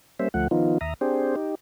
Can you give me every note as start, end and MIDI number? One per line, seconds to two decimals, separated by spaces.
0.19 0.29 55
0.19 0.29 58
0.19 0.29 61
0.19 0.29 72
0.19 0.29 76
0.34 0.48 38
0.34 0.48 53
0.34 0.48 57
0.34 0.48 78
0.51 0.78 51
0.51 0.78 53
0.51 0.78 59
0.51 0.78 63
0.51 0.78 65
0.81 0.94 39
0.81 0.94 76
0.81 0.94 82
0.81 0.94 87
1.01 1.36 60
1.01 1.36 62
1.01 1.36 67
1.01 1.36 68
1.01 1.36 72
1.36 1.55 63
1.36 1.55 67